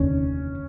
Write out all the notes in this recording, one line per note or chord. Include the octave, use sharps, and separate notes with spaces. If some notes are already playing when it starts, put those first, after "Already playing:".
Already playing: F1 D#2 D3 C#4